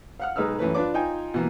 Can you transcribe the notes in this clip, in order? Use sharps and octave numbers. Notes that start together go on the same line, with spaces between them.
F5 F#5 F6
B1 G#3 D#4 B4 E6 F6
F#2 E3 A3 B4
D4 F4 B4 D5 D6
D#4 F4 G5 G#5
B2 E3 A#3